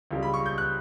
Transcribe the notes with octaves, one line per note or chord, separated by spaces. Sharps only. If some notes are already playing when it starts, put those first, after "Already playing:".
C#2 C#3 G3
B5
C#6
G6
F#6